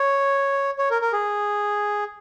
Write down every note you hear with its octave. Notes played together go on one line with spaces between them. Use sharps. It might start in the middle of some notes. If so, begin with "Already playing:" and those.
Already playing: C#5
C#5
A#4
A#4
G#4